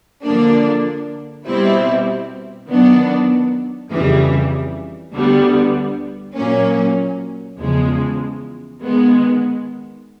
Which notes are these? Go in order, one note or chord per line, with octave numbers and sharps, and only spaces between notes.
D3 F3 A#3 D4
B2 G3 C4 E4
D#3 F#3 B3 D4
F2 C#3 E3 G3
D2 D3 G3 B3
A#2 F#3 A#3 C#4
E2 C#3 F3 G#3
D#3 G#3 B3